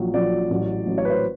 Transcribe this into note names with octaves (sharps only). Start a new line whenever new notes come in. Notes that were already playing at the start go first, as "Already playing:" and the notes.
Already playing: A#1 A#2 F#3
A#1 A#2 F#3 D5
A1 A2 F#3
A1 A2 F#3
C#5
B4
C5